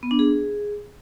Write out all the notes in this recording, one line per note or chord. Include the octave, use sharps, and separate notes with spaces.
B3
D4
G#4